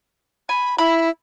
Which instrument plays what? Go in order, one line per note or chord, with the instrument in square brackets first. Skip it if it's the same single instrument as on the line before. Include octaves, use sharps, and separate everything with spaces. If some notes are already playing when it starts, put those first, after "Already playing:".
[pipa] G#5 [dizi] B5
[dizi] E4 [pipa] B5